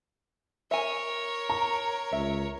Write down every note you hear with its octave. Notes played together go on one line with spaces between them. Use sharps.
A#4 C#5 E5 G#5
A#5
C#2 E5